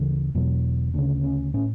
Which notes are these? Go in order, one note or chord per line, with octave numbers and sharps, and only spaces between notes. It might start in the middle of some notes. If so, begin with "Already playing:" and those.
Already playing: D2 C#3 E3
E1 E2 B2 F#3
D2 C#3 D4
C#4
A2 C#4